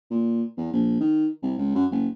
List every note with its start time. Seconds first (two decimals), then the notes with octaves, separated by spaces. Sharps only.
0.10 A#2
0.57 E2
0.73 A#1
1.00 D#3
1.42 C2
1.57 C#2
1.75 F#2
1.91 F#1